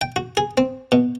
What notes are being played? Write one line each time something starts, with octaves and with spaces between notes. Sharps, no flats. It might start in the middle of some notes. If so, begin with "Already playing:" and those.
G5
F#4
G#4
C4
B2